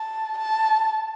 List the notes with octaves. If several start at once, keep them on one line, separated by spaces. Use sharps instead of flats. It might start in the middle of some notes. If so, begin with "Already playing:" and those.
Already playing: A5
A5